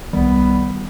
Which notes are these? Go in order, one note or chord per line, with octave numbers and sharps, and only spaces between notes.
C2 D#3 G3 B3